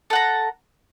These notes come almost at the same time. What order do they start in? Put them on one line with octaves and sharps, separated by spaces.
A4 F#5 A#5